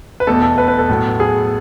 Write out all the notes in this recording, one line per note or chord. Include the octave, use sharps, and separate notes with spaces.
B4
E2 B2 A3 A4
A4
B4
B4
A4
A2 F#3 B3
G#4